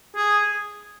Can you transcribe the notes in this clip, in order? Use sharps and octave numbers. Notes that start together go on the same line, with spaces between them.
G#4